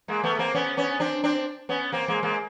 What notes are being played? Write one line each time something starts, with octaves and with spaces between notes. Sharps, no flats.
G#3 A#3
A3 B3
A#3 C4
B3 C#4
B3 C#4
C4 D4
C4 D4
B3 C#4
A#3 C4
G#3 A#3
G#3 A#3